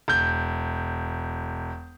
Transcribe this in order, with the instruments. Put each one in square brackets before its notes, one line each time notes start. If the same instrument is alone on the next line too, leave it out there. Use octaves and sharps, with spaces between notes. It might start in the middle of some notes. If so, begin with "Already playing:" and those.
[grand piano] E1 G6